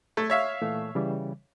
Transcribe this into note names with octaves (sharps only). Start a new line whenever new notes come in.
A3 G#6
C#5 E5 F5
A#2 E3 A3
C#3 E3 G3